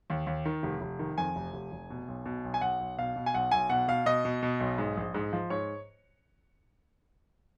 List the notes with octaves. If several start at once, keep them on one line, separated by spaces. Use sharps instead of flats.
D#2
D#2
D#3
F1
F1
D#3
F2 G#5
F1
F1
F1
B2
B1
B2
B1
G#5
B1 F#5
B1
B2 F5
B2
G#5
B1 F#5
B1 G#5
B2 F#5
B2 F5
B2 D#5
B2
B2
B1
G#2
A#1
G#2
F3
G#2 C#5